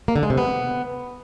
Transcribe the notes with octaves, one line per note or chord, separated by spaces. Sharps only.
A#3
D3
G#3
C3
B3